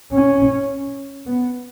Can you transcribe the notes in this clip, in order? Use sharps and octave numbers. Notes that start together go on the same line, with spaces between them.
C#4
B3